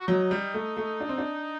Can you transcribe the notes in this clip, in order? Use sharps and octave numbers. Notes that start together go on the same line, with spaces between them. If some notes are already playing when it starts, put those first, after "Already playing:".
F#4
F#3 D#4
G3
A3
A3
D4
C4
D4